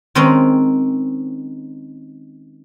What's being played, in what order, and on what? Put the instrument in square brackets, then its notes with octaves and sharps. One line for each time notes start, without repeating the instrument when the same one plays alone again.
[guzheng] D#3 G#3 C4 C#4 D#4